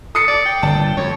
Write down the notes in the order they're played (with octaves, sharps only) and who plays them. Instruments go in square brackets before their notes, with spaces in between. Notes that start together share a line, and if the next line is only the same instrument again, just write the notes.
[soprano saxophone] A4 [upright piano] D#6 C7 C#7
[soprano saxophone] D5
G5
[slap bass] G1 A#2 [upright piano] A5
[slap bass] F2 [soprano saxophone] C#5